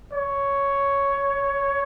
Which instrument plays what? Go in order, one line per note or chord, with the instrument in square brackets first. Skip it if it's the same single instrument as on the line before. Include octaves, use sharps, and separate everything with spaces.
[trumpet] C#5